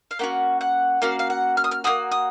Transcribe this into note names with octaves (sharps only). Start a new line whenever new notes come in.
F5
A#3 C#4 F#4 F#5
F#5
A#3 C#4 F#4 F5
F5
F#5
F6
D#6
F6
A#3 C#4 F#4 D#6
D#6